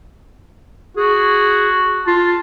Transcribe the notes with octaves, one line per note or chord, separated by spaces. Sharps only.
F#4 G#4
F4 A5